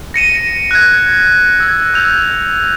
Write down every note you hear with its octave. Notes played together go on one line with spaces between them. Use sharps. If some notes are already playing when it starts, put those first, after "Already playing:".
A#6 C#7 D#7 E7
F#6 G#6
E6 G#6
E6 G6 F7